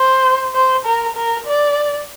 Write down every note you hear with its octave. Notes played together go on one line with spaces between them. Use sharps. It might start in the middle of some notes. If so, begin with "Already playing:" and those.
Already playing: C5
C5
A#4
A#4
D5